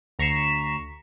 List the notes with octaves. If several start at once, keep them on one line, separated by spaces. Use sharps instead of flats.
D2 A#5 C#6 B6 C7 E7